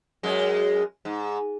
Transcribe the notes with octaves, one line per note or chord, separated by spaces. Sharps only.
F#2 G#3
G#2